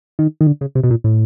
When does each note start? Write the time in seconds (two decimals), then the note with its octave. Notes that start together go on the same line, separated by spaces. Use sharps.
0.19 D#3
0.41 D#3
0.47 D3
0.61 C#3
0.75 C3
0.83 B2
0.90 A#2
1.04 A2